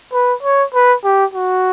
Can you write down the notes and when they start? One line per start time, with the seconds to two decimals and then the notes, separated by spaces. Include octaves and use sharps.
0.13 B4
0.43 C#5
0.74 B4
1.04 G4
1.34 F#4